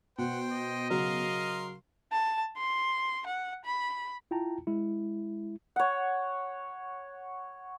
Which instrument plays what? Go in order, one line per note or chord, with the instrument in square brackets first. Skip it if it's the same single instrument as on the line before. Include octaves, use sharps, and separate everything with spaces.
[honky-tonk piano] B2 [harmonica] C5 G5 [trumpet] F#5
[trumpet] D#5
[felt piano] C#3 F#3 F#4 [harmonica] A#4 F5 C6
[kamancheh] A5
C6
F#5
B5
[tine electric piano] E4 F4 G5 A5 A#5
G#3 E4
[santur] C#5 F#5